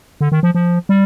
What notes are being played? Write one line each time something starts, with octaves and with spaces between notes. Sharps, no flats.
D3
D#3
F3
F3
G3